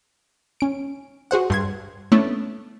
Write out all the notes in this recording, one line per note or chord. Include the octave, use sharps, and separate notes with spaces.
C#4 D7
F#4 G#4 C5 F#5
G2 C6 G#6
A3 B3 C#4 D4 E4